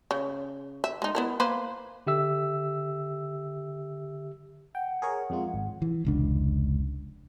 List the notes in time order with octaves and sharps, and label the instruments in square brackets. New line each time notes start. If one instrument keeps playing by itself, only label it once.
[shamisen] C#3
E5
G#3 D#4
B3 E4 A#4
A#3 B4 C5
[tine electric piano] D3 G4 E5 E6
[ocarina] F#5 [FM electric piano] G5
[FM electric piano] G#4 A#4 C#5
F2 G#3 F4
G#1
[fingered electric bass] E3
F1 C#2 D4